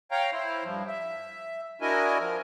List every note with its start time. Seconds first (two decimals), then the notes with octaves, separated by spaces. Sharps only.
0.11 C#5 F5 G5 A#5
0.32 E4 C5
0.64 G2 F3
0.88 E5
1.81 D4 E4 F#4 A#4 D#5 G#5
2.20 F3 A#4